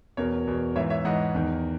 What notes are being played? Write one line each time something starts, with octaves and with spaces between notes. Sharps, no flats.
E2 B2 A#4 C#5
E2 B2
G#2 E3 C#5 E5
C#5 E5
G#2 E3 D#5 F#5
E2 D#3